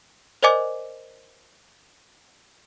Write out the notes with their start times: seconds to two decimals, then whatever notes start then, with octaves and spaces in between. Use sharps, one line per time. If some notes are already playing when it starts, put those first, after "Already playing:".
0.43 A#4 C5 D5 D#5 G#5 D6